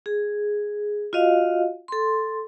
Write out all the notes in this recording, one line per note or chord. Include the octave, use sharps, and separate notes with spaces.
G#4
F4 F#4 D#5 F5
A4 C6